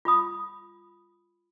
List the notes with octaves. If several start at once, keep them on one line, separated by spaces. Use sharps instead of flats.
F4 B5 D#6